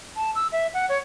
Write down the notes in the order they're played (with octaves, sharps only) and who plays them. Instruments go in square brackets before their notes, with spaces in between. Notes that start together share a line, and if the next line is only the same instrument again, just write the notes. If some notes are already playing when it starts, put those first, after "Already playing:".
[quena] A5
E6
E5
F#5
C#5